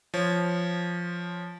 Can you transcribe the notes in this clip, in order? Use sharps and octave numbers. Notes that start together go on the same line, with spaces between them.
F3 C#5